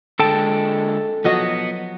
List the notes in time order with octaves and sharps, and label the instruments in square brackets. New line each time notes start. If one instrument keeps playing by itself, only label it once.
[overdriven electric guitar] D3 G#3 [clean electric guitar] A4 G5 A5
[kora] F3 F#3 D#5 [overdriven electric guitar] B3